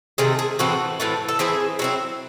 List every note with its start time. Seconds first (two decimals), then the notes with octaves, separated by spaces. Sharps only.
0.18 C3 D#3 A3 G#4
0.39 G#4
0.59 A2 E3 C4 F#4
1.00 A2 E3 A3
1.29 A4
1.39 E3 C4 E4 G#4
1.79 F#3 C4 E4